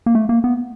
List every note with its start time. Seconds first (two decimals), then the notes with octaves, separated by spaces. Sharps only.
0.06 A#3
0.15 A3
0.29 A#3
0.44 B3